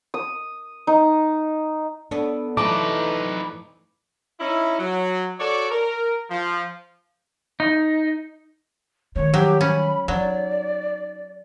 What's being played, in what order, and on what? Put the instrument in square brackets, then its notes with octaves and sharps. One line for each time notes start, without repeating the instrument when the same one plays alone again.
[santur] D#6
D#4
[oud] B3 A4 C#5 [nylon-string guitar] D4
[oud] E3 F3 A3 [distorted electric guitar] D#4 B4 [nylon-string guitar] A5 [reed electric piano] D6
[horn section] C#4 D#4 E4
F#3
F#4 A4 C#5 D5
A#4
F3
[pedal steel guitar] D#4
[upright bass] D#3 G3 [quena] C#5
[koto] F#3 [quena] G4
[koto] C#4 [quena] B5
[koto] F#3 [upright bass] D#4 [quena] D5